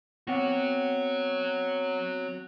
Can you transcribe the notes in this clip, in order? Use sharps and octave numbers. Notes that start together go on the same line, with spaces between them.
B3 C4 F#4 C#5 F#5